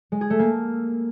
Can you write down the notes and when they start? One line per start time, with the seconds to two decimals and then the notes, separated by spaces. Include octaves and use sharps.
0.12 G#3
0.21 G#4
0.30 A3
0.39 A#3